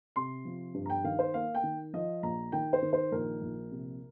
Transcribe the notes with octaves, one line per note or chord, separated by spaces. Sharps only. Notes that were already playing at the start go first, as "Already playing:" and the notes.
C3 C6
F3
G2
A#5
G5
D#3 F5
C5
A#3 F5
G5
D#3
F3 D#5
A#1 A#5
D#3 G5
C5
D#3
C5
A#1 A#4
A#1
C3